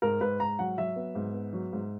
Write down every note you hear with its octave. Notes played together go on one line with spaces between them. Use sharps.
G#2 A#4
G#2 B4
G#2 A#5
F#3 F#5
F#3 E5
B3
G#2
B3
F#3
G#2